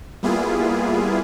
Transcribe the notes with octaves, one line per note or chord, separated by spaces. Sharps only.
G3 A#3 B3 E4 F4 G#4